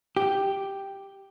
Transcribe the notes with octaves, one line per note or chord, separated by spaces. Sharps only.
G4